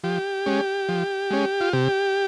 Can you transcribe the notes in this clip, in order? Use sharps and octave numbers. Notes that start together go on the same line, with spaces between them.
F3 G4
G#3 C#4
F3
G#3 C#4
F4
C3 G4